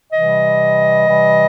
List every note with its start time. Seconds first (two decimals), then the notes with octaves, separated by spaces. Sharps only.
0.13 C3 E3 G3 D#5
1.07 C3 E3 G3